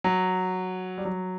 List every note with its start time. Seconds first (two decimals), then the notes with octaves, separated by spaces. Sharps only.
0.04 F#3
0.98 G3
1.05 F#3